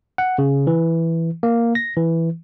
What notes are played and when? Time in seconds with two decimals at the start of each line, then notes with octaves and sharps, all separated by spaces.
0.18 F#5
0.38 C#3
0.67 E3
1.43 A#3
1.75 A#6
1.97 E3